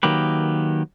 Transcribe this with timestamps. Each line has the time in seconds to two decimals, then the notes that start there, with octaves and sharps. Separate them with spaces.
0.03 D#3 F#3 A#3 G4 B4